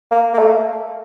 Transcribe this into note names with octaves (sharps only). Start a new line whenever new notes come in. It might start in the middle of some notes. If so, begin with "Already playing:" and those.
A#3
A#3
A3